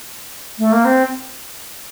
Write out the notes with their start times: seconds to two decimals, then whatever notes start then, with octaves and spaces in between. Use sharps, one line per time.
0.59 A3
0.72 A#3
0.85 C4